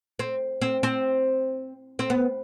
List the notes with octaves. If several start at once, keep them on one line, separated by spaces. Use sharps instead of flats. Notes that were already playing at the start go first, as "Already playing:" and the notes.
C4
C4
C4
C4
B3